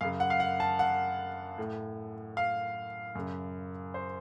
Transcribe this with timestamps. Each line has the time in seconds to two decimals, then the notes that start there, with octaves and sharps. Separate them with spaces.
0.01 F#2 C#3 F5
0.20 F#5
0.30 F5
0.40 F#5
0.60 A5
0.79 F#5
1.58 A2
2.37 F5
3.15 F#2 C#3
3.94 C5